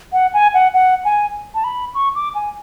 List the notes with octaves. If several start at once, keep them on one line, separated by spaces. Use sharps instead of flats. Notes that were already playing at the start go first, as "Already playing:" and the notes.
F#5
G#5
F#5
F#5
G#5
A5
B5
C#6
D6
G#5